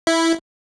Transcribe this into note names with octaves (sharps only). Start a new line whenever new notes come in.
E4